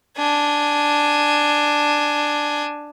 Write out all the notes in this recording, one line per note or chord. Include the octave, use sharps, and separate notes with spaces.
D4 G#5